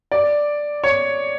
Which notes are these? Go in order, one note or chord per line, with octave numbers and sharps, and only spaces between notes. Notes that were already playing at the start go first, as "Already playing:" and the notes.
D5
C#5